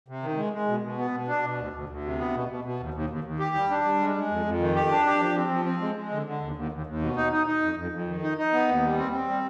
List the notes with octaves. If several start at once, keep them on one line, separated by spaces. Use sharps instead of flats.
C3
D#3
G#3
G#3
B2
B2
B3
B2
D4
B2
D2
D2
D2
C3
B3
B2
B2
B2
D#2
D#2
D#2
D#2
G4
G3
D4
G3
G#3
G#3
F2
F2
D#3
G4
D4
G4
F3
C4
F3
C4
G#3
G#3
D3
D3
D#2
D#2
D#2
D#2
B2
D#4
D#4
D#4
F2
F2
F2
D#3
D#4
D#4
B3
D#2
G3
C4
C4
G3